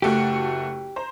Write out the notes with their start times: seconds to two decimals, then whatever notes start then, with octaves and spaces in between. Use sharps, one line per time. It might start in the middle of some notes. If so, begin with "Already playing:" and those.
0.02 F#1 A3 F#4 G4
0.96 C5 A#5